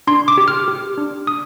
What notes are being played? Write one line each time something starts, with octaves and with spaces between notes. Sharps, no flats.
D4 C6
D6
G4
F6
G4
D4
D4 D#6